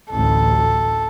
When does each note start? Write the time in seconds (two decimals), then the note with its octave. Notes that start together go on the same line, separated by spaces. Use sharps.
0.11 A1 D2 A4